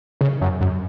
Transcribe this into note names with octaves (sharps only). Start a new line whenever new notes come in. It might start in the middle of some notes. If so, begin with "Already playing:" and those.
C#3
F#2
F#2